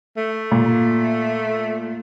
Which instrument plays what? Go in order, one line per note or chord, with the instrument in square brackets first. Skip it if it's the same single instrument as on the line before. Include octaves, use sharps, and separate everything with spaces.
[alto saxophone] A3
[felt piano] A#2